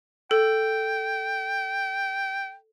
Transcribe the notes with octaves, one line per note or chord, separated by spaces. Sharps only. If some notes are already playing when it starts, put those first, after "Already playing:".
A4 G5